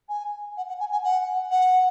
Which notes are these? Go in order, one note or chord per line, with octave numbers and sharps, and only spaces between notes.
G#5
F#5
F#5
G#5
G#5
F#5
F#5